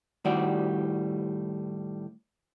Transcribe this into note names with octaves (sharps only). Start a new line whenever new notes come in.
A2 D#3 G3 F#4 G4 D5